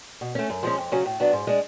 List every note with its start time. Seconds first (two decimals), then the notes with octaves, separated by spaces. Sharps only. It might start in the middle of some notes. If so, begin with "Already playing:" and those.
0.21 B2
0.35 A3 C#4
0.50 F#2
0.63 F3 G#3 C#4
0.78 F2
0.92 C#3 F#3 C#4
1.06 A2
1.20 F#3 B3 D4
1.33 G#2
1.47 G#3 D4